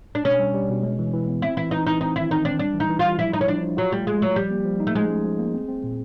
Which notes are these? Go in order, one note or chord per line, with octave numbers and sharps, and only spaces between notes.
D4
B2 C#4
G3
G3
B2
G#3
E3
E3
B3
C4 E4
E3 E4
E3 D#4
E3 D#4
C4 D#4
D#3 E4
D#3 D#4
C4 D4
G3 D4
E3
D#4
E3
G3 F4
F3 E4
D#4 E4
C#4
F3 D4
F3
F#3 F4
G3 A3
G#3 F4
F#3 A3
F3 G3
A#3
F3
D#4
A3
F3 G#3
C#4
F3
A#3
C4
C4
A#2